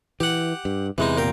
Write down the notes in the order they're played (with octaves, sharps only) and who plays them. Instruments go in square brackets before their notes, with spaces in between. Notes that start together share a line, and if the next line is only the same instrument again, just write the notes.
[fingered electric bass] E3 [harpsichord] G4 F#5
[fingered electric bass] G2
[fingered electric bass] E2 C3 [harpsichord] E3 G#3 D#4
[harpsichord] A#2 A#4 G5